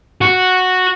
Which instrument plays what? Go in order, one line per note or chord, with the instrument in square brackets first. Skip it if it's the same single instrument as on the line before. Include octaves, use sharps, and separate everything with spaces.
[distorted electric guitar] F#4